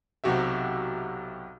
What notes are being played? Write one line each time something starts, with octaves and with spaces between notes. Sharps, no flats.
B1 C3 F#4 G4 E5